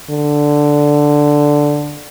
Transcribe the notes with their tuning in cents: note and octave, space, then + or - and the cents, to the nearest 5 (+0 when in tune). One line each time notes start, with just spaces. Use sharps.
D3 +0